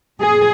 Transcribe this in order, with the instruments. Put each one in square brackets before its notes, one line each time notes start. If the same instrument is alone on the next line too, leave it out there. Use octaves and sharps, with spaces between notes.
[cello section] A#2 G#4